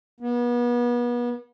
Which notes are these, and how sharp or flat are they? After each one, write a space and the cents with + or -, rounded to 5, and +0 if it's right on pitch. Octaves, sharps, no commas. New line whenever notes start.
B3 -35